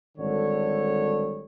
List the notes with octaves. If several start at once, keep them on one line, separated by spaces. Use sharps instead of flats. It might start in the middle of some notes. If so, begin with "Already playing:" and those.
G#1 D3 G3 A4 C#5